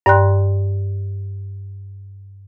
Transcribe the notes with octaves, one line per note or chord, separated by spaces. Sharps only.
G2 D5 G5 C6 F#6